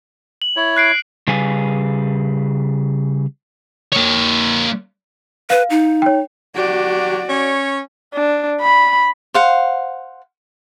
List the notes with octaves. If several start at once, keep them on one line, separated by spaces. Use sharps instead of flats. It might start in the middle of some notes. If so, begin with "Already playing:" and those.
F#7
E4 C#5
F#6 C7 D7
C#3 G3 G#4 B4 F5 G#5
A#3 C#5
B4 F5
D#4
C#5 G5
F#3 F#4 G4 D5
C#4 C#5
D4
B5
C5 F5 F#5